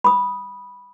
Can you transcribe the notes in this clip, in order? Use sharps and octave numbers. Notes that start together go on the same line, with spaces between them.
B5 D#6